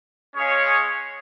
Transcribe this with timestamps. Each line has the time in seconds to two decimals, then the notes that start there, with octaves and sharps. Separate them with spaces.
0.34 G#3 C#4 G#4 C#5 F5